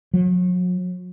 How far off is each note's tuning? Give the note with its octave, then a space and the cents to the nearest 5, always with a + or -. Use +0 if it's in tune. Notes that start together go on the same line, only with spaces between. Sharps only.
F#3 -40